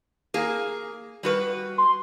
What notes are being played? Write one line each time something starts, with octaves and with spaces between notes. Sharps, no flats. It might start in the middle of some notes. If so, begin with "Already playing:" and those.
A#3 G#4
G3 F#4 B4
C6